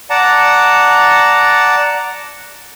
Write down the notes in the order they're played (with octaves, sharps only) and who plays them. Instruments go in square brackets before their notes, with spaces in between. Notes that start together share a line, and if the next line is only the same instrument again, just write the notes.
[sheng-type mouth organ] D5 F#5 A5 A#5